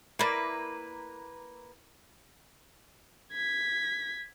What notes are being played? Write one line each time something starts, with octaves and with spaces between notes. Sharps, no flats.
A#3 E4 A#4 B4 D5
G#6 B6